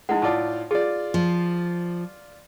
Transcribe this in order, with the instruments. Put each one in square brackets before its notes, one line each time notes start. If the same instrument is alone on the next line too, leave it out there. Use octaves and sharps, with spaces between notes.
[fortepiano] G#3 [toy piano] D#4 E4 F#5
[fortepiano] A2 F4 D5 [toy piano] A5 D6 D#6
[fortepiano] F4 D5 [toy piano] G#4
[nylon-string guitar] F3